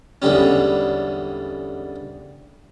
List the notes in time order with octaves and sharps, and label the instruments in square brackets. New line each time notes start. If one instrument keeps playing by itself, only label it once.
[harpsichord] E2 G#2 D3 G3 C#4